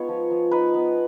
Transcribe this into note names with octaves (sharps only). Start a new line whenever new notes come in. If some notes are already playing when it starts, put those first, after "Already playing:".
Already playing: G#3 B3 D#4 F4 C#5
F3
F3
D#4 B4
B3